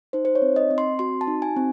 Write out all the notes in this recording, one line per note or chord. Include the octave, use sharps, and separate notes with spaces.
D#4 C5
C5
C#5
C4
D#5
C4
C6
F#4 C6
A5
D#4
G#5
C4